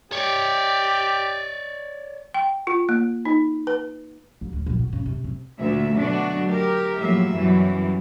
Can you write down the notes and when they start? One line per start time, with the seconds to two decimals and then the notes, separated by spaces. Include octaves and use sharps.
0.12 G4 C#5 D5
2.34 G5
2.67 F4
2.89 A#3
3.25 D#4
3.67 B4
4.41 A1
4.53 D2
4.66 A#1
4.79 B2
4.93 C#3
5.06 C3
5.24 C3
5.59 D2 A#2 E5
5.96 B2 D3 F#3 A3 D4 F#4
6.48 G4 A#4
6.99 A2 F3 F#3 A#3 E5
7.33 F#2 B2 E3 F#3 G3